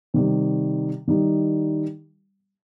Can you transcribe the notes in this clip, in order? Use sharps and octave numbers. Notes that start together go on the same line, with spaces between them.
C3 D#3 G3
D#3 G3 D#4